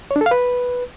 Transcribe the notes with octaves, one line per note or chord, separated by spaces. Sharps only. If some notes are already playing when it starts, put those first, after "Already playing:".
C#5
D4
A4
F5
B4